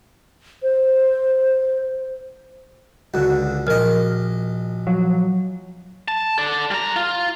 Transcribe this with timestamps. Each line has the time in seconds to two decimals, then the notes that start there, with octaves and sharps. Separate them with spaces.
0.63 C5
3.14 C#2 D3 F#4
3.67 A#1 A#4 D#5 F6
4.87 F3 F#3
6.08 A5
6.38 A4 D5
6.71 G3 A#5
6.96 F4